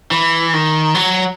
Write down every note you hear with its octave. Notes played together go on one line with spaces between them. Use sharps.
E3
D#3
F#3